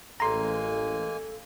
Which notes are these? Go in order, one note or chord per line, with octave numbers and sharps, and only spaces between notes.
A1 G#3 A#3 A4 G#5 A#5 C6